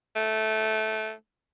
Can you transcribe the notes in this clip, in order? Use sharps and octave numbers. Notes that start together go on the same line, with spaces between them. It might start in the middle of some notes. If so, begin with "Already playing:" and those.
A3